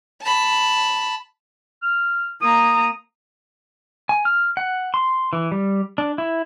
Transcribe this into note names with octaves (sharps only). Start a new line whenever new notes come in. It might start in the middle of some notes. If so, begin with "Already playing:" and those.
A5 B5
F6
A#3 A#5 D#6
G#5
F6
F#5
C6
E3
G3
D4
E4